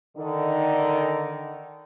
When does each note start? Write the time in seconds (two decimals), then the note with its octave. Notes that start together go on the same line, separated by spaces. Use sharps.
0.17 D3 D#3 D#4